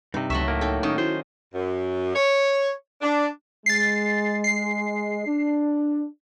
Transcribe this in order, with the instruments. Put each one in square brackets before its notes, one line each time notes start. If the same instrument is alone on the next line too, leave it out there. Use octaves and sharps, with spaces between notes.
[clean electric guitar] G2 C3 [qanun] D#4
[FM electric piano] C#2 C#6 [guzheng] F#3 A3 E5
[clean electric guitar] A2 A#3
[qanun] D#4 A4 G5
[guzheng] D#3 [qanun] C#4 [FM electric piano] C#6 D#6
[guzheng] D#3 [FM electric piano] E4 F#4 [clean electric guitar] C5
[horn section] F#2
C#5
D4
[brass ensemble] G#3 [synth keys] A6 C7
[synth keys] C7
[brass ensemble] D4